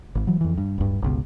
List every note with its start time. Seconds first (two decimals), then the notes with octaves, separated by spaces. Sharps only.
0.15 G#1
0.27 E3 F#3
0.41 F2 E3
0.57 G2
0.78 D1 G2
1.02 G1 C#2 B2